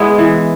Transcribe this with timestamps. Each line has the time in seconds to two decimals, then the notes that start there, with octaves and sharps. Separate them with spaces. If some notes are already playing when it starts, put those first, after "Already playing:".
Already playing: G#3 B3 E4
0.18 E3